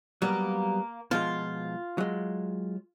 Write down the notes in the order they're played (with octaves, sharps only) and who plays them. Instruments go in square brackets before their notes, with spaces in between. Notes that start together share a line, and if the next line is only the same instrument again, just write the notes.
[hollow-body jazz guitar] F#3 G3 B3 [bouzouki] A#3
[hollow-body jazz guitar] B2 F3 G#3 [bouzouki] F4
[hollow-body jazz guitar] F#3 G#3